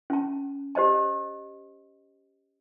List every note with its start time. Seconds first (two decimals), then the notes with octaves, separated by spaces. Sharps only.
0.10 C#4 A5
0.75 G4 C5 D#5 A5